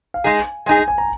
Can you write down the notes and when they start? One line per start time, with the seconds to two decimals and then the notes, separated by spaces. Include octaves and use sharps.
0.14 F5
0.24 G#3 D#4 G#4 G#5
0.66 G#3 D#4 G#4 G#5
0.77 G#5
0.88 G#5
0.98 A#5